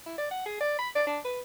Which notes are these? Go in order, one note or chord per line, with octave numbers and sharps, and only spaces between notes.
E4
D5
F#5
G#4
D5
B5
D5
D4
B4